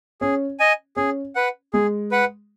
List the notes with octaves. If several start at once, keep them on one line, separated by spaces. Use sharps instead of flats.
C#4 G#4
D#5 G#5
C#4 G#4
B4 F#5
G#3 G#4
B4 F#5